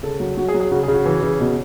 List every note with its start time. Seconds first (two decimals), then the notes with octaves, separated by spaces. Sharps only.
0.03 C#3 A4
0.20 F#3
0.37 F#3 F#4
0.48 G#4
0.54 F#3
0.60 G#4
0.71 C#3 F#4
0.83 G#4
0.88 C#3
0.94 F#4
1.06 E3
1.23 C#3
1.40 B2